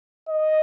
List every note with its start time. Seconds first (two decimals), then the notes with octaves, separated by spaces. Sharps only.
0.29 D#5